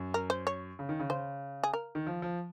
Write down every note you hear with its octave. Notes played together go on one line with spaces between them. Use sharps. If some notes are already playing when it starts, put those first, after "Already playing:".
Already playing: F#2
A#4
C5
C#5
C#3
D#3
C#3
C#3 C5
G#4
A#4
D#3
F3
F3